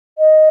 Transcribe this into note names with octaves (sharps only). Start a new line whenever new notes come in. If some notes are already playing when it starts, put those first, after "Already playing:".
D#5